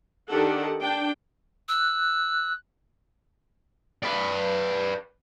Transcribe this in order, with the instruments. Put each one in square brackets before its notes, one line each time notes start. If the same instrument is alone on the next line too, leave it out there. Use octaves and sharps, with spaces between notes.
[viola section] D#3 D4 D#4 G4 A4 F#5
D4 G5
[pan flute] E6 [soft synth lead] F#6
[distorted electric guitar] B4 D5